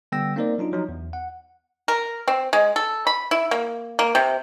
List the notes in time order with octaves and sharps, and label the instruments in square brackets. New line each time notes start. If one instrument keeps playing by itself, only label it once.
[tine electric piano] D3 G3 B3 G5 E6 A#6
A#3 C4 D#4 A#4 C5 D5
F#3 D4 D#4 F4
F3 F#3 D#4
E2
F#5
[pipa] A#4
C4
G#3
A4
B5
E4
A#3
A#3
C3